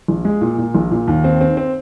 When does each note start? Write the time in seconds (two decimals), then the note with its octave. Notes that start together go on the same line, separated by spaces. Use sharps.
0.08 A#1
0.25 G#3
0.41 A#2
0.58 A#2
0.75 A#1
0.91 A#2
1.08 D#2
1.24 C4
1.41 C4
1.57 C4